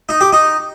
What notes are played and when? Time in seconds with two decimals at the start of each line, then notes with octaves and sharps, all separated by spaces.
0.09 D#4
0.21 G4
0.33 D#4